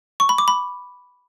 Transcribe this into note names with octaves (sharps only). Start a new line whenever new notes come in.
C#6
B5
D6
B5